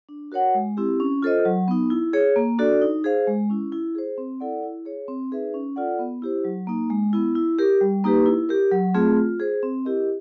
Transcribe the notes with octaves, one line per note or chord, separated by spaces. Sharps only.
D4
F#4 A#4 C#5 F#5
G#3
C4 E4 G4
C#4
F4 A4 C5 D#5
F#3
B3 D#4
E4
G#4 C#5
A#3
D4 F#4 A4 D5
D#4
G#4 C5 F5
G#3
C#4 E4
E4
G#4 C5
C4
E4 A4 D5 F#5
E4
G#4 C#5
C4
D#4 G#4 B4 E5
C#4
F4 A4 D5 F#5
B3
E4 G4 C5
F#3
A#3 D#4
G#3
B3 E4
E4
G4 A#4
G3
A#3 D#4 G4 B4
E4
G4 A#4
F#3
A3 C4 F4 G#4
F4
G#4 C5
C4
E4 G4 A#4 D#5